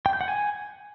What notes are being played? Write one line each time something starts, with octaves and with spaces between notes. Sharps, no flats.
G5
G6
F#5
G#5